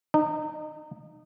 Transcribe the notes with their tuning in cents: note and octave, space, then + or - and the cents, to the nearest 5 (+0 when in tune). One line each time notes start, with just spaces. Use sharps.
D#4 -30